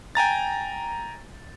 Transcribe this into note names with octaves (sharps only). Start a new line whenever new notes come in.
G5 G#5 A#5 A6